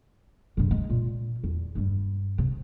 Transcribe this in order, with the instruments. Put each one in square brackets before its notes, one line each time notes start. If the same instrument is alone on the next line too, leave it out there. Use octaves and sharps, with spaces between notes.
[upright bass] G2 C3
G#3
A#2
E2
G2 G3
C3